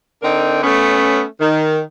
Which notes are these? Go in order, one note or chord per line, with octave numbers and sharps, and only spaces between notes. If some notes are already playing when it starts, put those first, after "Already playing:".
D3 C4 D4 D#4 A#4
A3 B3 C#4
D#3